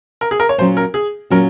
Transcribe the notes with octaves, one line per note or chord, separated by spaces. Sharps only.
A#4
G#4
A#4
C#5
A#2 F#3 C#4 C5
A#4
G#4
A#2 F#3 C#4 F#4 A#4